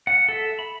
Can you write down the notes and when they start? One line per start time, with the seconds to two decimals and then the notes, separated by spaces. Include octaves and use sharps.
0.07 F#5
0.29 A4 E5
0.59 B5